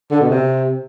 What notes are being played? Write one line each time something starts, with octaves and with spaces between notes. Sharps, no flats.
D3
B2
C3